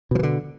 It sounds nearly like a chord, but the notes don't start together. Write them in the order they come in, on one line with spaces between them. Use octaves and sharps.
B2 F3 E3 D3